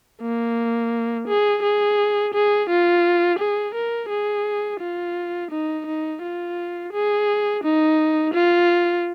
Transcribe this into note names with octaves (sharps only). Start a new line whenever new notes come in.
A#3
G#4
G#4
G#4
F4
G#4
A#4
G#4
F4
D#4
D#4
F4
G#4
D#4
F4